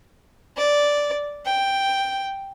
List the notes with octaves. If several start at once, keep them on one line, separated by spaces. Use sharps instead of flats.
D5
G5